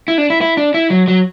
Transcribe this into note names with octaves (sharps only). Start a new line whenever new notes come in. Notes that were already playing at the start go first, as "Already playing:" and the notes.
E4
D4
E4
E4
D4
E4
F#3
F#3